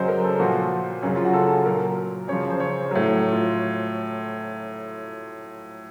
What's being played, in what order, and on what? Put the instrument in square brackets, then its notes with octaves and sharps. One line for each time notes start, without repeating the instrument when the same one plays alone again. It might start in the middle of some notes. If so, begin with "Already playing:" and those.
Already playing: [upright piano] F#2 C#3 F#3 C5 D#5
A#4
A4
A#2 F3 F#4
F#2 C#3 F#3 C#4
F4
F#4
A4
A#2 F#3 A#4
F#2 C#3 F3 C#5
C5
C#5
A2 F#3
F4